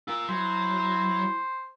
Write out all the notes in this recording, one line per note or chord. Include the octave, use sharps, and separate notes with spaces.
F4 A#4 E6
F#3 E4 C5